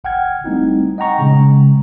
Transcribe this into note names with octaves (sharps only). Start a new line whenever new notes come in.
G1 F#5 G5 F6 G#6
G3 A3 C4 D#4 E4
D#5 F#5 G5 A#5 C#6
A#2 C#3 G#3 C#4